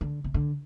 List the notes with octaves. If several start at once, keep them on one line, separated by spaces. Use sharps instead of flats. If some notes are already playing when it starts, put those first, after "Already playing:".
D3
C3
D3